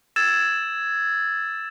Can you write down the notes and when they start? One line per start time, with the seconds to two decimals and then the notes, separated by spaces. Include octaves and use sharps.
0.16 E6 G#6 A6 E7